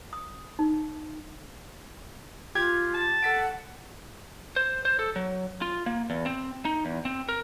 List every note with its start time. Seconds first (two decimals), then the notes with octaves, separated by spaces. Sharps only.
0.13 D#6
0.59 D#4
2.55 F4 G4 G#6
2.94 A5
3.22 A4 F#5 B6 D7
4.56 C5
4.85 C5
4.99 A4
5.16 F#3
5.62 F4
5.86 A#3
6.10 E2
6.26 C4
6.65 D#4
6.85 E2
7.05 C4
7.29 A#4